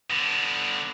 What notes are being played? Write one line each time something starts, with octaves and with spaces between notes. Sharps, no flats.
D3 B3